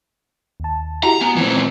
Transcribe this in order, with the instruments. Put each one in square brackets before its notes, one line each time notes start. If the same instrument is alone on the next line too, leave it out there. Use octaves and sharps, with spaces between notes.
[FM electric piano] D#2 A5
[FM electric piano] E4 F#4 G4 [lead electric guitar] A#5
[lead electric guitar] B3 [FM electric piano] G#5
[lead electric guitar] A#2 E3 [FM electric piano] F3 C4